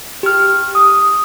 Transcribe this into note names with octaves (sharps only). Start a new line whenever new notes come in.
G4 F6
D#6